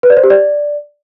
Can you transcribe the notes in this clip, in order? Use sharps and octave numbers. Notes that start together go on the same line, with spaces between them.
B4
D5
C5
G4
D5